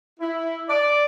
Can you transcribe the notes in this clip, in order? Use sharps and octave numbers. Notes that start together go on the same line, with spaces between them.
E4
D5